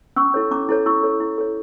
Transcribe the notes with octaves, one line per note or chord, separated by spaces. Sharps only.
C#4 C#6 E6
E4 A4 C#5
C#4 A#5 D6
E4 A4 C#5
E4 C#6 E6
A4 C#5
E4
A4 C#5